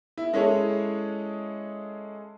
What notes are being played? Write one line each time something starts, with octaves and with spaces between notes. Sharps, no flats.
E4
G#3 C#4 E4 G#4 A4 C#5